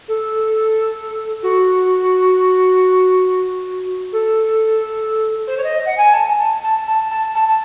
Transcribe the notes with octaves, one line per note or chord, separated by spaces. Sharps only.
A4
F#4
A4
C5
C#5
D#5
F#5
G#5
A5
A5
A5
A5
A5
A5
A5